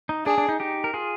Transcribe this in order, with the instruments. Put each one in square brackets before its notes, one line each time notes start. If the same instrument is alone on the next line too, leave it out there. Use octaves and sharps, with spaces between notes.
[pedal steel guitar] D#4
[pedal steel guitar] D4 [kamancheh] G#4
[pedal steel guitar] D4
D#4
D#4 G4
A#4
F4 G#4